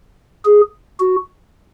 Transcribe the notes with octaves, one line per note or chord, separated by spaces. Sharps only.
G#4
F#4